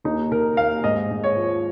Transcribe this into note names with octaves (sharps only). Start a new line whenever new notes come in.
D#2 D#4
D#3 A#4
D#2 F5
G#2 D#5
G#2
C#5
F3